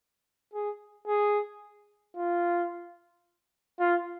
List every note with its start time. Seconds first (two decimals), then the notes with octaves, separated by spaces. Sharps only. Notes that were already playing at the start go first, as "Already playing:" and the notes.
0.54 G#4
1.08 G#4
2.17 F4
3.80 F4